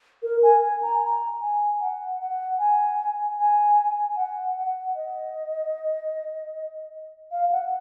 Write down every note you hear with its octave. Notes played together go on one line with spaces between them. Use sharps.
A#4
G#5
G#5
A#5
A#5
G#5
F#5
F#5
G#5
G#5
F#5
F#5
D#5
F5
F#5